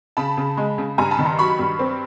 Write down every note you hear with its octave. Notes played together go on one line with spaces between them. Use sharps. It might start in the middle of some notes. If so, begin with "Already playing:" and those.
C#3 A5 B5
C#3
G#3
C#3
G2 G#5 A#5
A5 B5
D#3
A#5 C6
F#3 B5 C#6
G2
C4